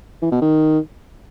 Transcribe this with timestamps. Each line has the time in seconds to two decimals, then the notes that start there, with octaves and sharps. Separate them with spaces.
0.22 E3
0.32 B2
0.42 D#3